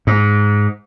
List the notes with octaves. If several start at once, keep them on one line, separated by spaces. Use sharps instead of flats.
G#2